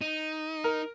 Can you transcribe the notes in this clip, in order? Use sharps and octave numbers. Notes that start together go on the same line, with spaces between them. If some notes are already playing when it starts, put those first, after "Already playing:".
D#4
A#4